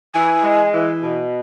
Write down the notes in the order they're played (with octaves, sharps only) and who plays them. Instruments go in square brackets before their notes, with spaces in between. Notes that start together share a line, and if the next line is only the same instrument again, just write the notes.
[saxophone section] E3 [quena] G#5
[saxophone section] G#3
E3
B2